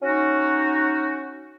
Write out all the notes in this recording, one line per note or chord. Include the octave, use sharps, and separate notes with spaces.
C#4 D#4 F#4